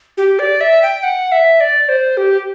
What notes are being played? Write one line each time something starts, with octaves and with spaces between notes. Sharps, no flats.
G4
D5
E5
G5
F#5
E5
D5
C5
G4